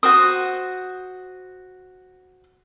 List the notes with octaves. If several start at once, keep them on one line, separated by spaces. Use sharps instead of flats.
F#4 C5 D#6